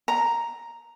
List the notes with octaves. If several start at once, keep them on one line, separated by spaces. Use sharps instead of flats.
A#5